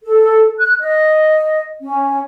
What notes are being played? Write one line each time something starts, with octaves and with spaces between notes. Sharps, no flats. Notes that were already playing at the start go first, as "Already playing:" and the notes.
A4
F#6
D#5
C#4